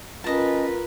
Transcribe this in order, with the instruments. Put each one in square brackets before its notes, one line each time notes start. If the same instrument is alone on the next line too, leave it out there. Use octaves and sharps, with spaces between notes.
[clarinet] C#4 [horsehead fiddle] F4 A#4 [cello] B4 [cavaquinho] D#5 A5